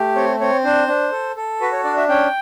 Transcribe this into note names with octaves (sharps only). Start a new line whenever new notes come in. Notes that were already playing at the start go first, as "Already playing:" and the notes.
Already playing: A3 G4
C4 C#5
C4 C#5
D4 C5
D4
A4
A4
F#4 B4
C#5
D4 D5
E5
C#4 G5